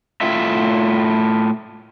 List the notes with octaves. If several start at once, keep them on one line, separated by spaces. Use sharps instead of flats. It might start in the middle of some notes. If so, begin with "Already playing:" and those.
A2 F4 E5